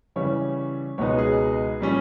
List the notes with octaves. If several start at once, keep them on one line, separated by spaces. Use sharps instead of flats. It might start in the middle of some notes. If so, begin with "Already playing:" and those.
C#3 E3 G3 C#4 C#5
C#2 B2 G#3 B3 D#4 C#5
G#4
A#2 G3 C#4